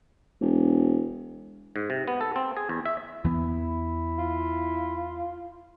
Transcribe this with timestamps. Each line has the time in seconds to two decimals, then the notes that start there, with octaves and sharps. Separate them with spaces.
0.41 E1
1.76 G#2
1.90 C3
2.08 B3
2.21 A4
2.36 C4
2.57 G#4
2.69 E2
2.85 E5
3.24 E2 E3 B3 E4
4.18 F4